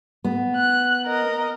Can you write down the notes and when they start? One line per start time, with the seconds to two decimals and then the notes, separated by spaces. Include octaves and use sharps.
0.24 B3
0.57 F#6
1.06 A#4 D#5